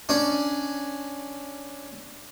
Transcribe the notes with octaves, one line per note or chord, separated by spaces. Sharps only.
C#4 D4